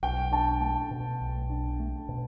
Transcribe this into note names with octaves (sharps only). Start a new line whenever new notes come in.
B1 G5
D4 A5
A3 A5
B2
B1
D4
A3
B2